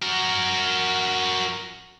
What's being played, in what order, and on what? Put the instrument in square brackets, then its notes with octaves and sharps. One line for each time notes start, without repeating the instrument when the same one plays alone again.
[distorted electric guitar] F#4 A#4